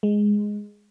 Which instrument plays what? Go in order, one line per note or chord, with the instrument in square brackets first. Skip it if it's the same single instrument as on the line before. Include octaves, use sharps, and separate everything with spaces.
[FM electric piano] G#3